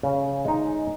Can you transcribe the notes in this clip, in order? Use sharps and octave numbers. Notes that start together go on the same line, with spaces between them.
C#3
G#3 D#4